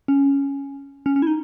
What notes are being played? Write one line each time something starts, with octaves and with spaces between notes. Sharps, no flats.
C#4
C#4
C#4
E4
D#4